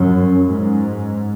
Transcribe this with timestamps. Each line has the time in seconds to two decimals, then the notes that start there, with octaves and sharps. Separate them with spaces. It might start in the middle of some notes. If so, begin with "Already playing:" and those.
Already playing: F#2
0.47 G#2